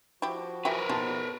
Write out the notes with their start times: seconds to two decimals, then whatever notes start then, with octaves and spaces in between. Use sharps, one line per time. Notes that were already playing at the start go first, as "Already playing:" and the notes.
0.22 F3 E4 F#4 G4
0.65 F#3 G4 A#4 B4 E5 G#5
0.89 B2 D#4 A5 C6